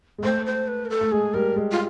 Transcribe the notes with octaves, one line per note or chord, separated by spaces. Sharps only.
G#3
A3 C5
C5
B4
A#4
A4
A3
G#3 G#4
G3 A#4
G#3
F4